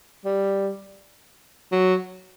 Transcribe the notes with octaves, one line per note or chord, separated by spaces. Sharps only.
G3
F#3